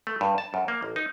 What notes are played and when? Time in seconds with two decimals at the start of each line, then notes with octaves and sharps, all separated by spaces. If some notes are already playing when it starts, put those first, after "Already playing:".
0.07 A3
0.21 G2
0.38 A5
0.54 F#2
0.68 A#3
0.82 A1
0.96 D#4